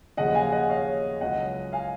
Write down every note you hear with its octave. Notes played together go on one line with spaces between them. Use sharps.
D#2 C#3 F3 D#5 F#5
F5 G#5
D#5 F#5
C#5 F5
C#2 C#3 F#3 D#5 F#5
F5 G#5